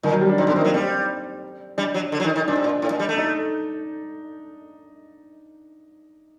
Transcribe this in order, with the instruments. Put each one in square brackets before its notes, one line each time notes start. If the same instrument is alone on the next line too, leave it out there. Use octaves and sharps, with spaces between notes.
[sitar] A#2 [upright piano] D#3
[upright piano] F#3
G3
D4
[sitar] C3 [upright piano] D#4
[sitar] D3
[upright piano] C4
[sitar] D#3
[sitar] F#3 [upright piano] A#3
[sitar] G3 [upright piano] C4
[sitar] G3 [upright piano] D4
[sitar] F#3
D3
F#3
D#3
D#3
[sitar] A#2 [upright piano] D4
[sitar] C3
A#2
A2
A#2
G3
A3
[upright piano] D#4